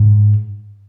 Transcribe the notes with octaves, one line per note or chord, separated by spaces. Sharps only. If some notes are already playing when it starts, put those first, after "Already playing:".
Already playing: G#2